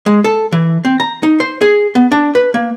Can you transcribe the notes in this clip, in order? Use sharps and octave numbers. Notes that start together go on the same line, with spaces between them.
G#3
A4
E3
C4
A#5
D#4
C5
G#4
B3
D4
B4
A#3